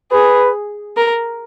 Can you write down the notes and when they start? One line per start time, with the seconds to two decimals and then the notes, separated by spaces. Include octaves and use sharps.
0.12 G#4 B4
0.96 A#4